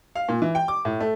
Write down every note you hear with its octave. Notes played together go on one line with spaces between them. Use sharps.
F5
A#2
E3
G5
D6
A2
A3